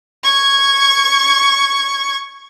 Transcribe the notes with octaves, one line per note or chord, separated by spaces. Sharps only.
C#6 G#6